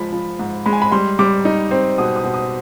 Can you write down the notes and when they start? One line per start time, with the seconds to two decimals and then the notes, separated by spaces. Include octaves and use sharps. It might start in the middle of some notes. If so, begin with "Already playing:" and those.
Already playing: F3 G#3 B5
0.12 F3
0.39 G#2
0.66 G#3 B5
0.73 G#5
0.82 B5
0.92 G3 C6
1.19 G3 D6
1.45 D#4
1.71 C4
1.98 B2 D#6
2.16 D#6
2.24 B2
2.34 D#6